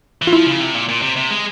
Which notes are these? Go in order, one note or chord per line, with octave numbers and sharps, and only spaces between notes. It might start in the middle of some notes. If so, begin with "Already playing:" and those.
E3
F4
F3 E4
C#3
C3
A#2
A#2
C3
C3
G#3